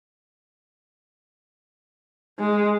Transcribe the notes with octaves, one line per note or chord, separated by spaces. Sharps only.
G#3